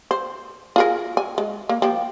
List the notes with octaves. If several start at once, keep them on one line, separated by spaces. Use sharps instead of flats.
C5
F4 G#4 A#4
G#5
G#3
A#3
F3 A#3 G4